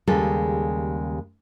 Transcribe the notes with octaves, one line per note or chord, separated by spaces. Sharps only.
D#2 C#3 G3 G#3 A4